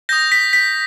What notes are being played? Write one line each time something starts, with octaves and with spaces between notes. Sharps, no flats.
D#6 G6 A#6
B6
B6